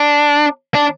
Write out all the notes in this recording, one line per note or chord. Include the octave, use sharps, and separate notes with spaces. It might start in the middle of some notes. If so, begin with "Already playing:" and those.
Already playing: D4
D4